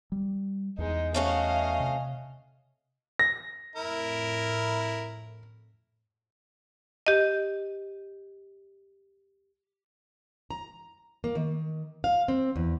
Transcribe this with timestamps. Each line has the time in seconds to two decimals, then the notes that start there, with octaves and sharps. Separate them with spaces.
0.12 G3
0.78 E2 G#3 D#4
1.14 A3 C#4 F#4 D#5 F5
1.80 C3
3.19 A#6
3.76 F2 A2 E4 A#4
7.07 G4 D#5
10.51 A#5
11.24 A#3
11.35 D#3
12.04 F5
12.28 C4
12.56 E2